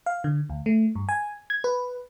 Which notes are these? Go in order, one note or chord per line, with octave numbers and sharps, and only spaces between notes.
F5
D3
D2
A3
G2
G#5
G#6
B4